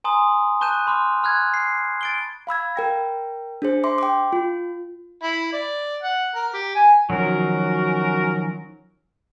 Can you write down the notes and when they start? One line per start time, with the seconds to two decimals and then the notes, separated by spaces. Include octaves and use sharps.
0.04 G#5 A#5 C6 D#6
0.61 A5 C#6 F#6 G6 D#7 E7
0.87 B5 C6 D6 F6
1.23 B5 F6 F#6 G#6
1.54 C7
2.01 A6 D7 G7
2.47 F5 B5 E6 G#6
2.76 A#4 G5 A#6
3.62 D4 G#4 C5
3.84 E5 C6 D6
3.98 G5 D6
4.33 F4
5.23 E4
5.53 D5
6.02 F#5
6.35 A#4
6.53 G4
6.75 G#5
7.10 D#3 F3 F#3 C#4 F#4 A#4